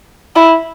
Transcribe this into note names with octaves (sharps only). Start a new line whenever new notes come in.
E4